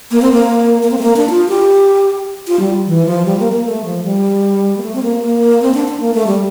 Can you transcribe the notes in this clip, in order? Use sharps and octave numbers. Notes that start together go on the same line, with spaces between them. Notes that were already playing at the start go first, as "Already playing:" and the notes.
A#3
C4
A#3
A#3
C4
A3
A#3
D4
F4
G4
F4
G3
E3
F3
G3
A#3
A#3
A3
F3
G3
A#3
A3
C4
A#3
A#3
C4
D4
D4
A#3
A3
G3